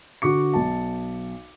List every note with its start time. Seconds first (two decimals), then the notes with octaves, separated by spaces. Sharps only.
0.22 D3 F#4 D6 C#7
0.54 B1 A5